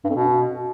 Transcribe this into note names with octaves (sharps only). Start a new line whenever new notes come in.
G2
F2
B2